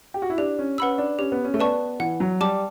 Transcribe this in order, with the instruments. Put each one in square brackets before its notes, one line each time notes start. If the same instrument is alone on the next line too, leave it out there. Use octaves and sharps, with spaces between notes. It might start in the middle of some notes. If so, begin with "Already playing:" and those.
[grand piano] G4
F#4
E4
[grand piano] D4 [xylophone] G4
[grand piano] C#4
[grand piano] C#4 [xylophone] B4 F#5 B5 E6
[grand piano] D4
[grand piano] C#4 [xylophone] G4
[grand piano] B3
C#4
A3
[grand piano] B3 [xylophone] B4 D5 A5 C#6
[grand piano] E3 [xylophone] F#5
[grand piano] F#3
[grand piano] G3 [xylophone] A5 D6